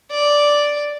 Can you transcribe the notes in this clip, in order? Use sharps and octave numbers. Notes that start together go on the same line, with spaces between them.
D5